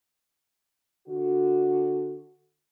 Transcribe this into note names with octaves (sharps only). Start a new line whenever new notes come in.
D3 F#4